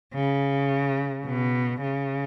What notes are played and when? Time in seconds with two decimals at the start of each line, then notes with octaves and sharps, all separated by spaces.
0.14 C#3
1.26 B2
1.82 C#3